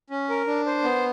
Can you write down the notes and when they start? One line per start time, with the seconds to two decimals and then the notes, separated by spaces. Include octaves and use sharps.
0.10 C#4
0.30 A#4
0.47 D4
0.66 C5
0.83 B3